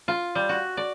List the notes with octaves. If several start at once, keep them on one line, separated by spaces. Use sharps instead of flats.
F4
G3
F#4
D5